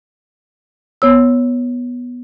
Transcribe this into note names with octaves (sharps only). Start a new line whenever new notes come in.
B3 C#5 E6